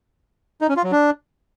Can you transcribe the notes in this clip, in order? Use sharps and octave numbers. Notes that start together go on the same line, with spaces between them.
D#4
C#4
F4
F#3
D4